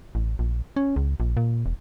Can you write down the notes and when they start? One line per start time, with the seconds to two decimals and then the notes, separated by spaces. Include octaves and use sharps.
0.15 A1
0.39 A#1
0.76 C#4
0.96 C#2
1.20 A#1
1.37 A#2
1.66 E1